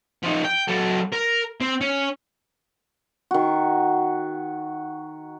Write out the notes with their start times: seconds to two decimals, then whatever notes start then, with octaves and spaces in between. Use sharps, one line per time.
0.23 F3 D#4
0.44 G5
0.68 F#3 A4
1.12 A#4
1.61 C4
1.81 C#4
3.31 D#3 F#4